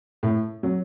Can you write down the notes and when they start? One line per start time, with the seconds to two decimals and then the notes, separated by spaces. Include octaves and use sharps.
0.23 A2
0.63 F#3